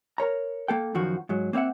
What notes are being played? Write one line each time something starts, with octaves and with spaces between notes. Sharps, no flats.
A#4 C#5 A#5
A#3 A4 G5
F#2 D#3 F3 F#4
G#2 F#3
A#3 C4 C#5 E5 F#5